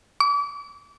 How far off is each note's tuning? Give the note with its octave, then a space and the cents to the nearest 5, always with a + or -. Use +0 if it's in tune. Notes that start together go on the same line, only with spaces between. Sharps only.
D6 -40